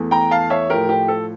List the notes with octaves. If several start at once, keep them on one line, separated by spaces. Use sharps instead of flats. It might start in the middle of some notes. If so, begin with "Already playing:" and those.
Already playing: E2 E3 A3
G5 A#5
F5 A5
C#5 E5
A2 F3 A3 G4 A#4
G4
A4